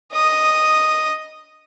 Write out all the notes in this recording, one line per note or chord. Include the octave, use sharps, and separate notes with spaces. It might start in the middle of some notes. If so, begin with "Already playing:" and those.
D#5 D#6